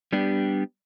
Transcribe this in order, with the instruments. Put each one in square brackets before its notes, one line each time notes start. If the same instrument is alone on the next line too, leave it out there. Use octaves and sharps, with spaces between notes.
[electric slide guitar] G3 B3 D4 G4